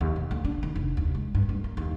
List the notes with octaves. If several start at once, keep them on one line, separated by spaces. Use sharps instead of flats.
D#2
B2
D2
D4
D#3
F1
D#2
G#3
G2
G2
A#3
D#2